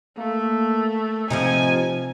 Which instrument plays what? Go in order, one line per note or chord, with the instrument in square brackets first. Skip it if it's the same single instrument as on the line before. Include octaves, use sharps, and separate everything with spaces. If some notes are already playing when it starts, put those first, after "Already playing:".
[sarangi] A3 [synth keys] A#3
[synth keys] C3 [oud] F3 C4 D#4 [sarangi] G#5